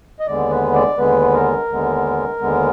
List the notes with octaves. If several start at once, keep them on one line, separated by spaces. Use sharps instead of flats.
D#5
D#2 D3 G#3 B3 D5
B4
D5
D#2 D3 G#3 B3 B4
A#4
D#2 D3 G#3 B3
D#2 D3 G#3 B3